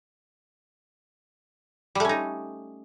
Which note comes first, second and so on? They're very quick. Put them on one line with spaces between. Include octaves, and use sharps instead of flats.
G3 A3 C#4 D#4